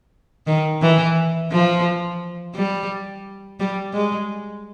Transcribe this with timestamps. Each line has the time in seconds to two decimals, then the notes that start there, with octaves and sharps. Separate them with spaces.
0.47 D#3
0.82 E3
1.52 F3
2.55 G3
3.60 G3
3.94 G#3